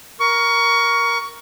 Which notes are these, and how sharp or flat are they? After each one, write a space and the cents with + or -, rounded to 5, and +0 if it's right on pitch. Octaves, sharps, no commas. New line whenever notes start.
A#4 +10 C#6 +20